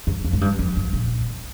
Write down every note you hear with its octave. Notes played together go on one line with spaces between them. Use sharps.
G2
F2
G#2
G2
F2
G2
A#2